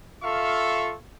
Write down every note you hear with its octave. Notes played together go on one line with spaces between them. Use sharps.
F4 A4 E5 F5 C#6